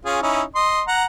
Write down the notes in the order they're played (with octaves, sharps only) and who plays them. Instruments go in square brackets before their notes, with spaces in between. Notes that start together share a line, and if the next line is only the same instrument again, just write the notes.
[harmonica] C#4 F4 G#4
C#4 D#4 E4
D#5 C6
F#5 A#5